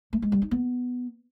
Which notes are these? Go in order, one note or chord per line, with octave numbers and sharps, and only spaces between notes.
A3
G#3
G3
D#4
B3